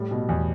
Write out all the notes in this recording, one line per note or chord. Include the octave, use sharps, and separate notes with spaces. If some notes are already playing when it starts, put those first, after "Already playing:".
Already playing: A2 G3
B2
E2